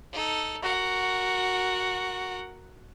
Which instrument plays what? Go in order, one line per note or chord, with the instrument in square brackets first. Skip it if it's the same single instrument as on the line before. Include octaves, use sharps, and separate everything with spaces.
[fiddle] D#4 A4
[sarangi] F#4 [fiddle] A#4 F#5